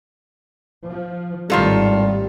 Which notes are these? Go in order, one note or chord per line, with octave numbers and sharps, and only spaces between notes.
F3
G#1 A2 D#3 G3 F4 A4